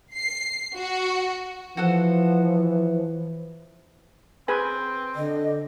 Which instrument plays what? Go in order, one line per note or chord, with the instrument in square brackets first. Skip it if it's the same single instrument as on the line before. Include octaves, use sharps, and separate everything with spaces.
[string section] C7
F#4
[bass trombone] E3 [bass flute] F3 [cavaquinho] F#4 A4 F#5
[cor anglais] C4 [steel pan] G#4 B4 G#5
[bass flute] D3 [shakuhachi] D#5